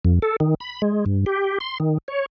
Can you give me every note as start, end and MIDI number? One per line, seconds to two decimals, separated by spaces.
0.05 0.19 41
0.22 0.36 69
0.40 0.54 51
0.60 0.82 83
0.82 1.05 56
1.06 1.25 43
1.26 1.58 67
1.60 1.78 84
1.80 1.98 51
2.08 2.26 73